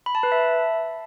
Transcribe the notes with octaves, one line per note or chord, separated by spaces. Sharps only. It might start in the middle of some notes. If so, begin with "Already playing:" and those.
B5
A5
B4
E5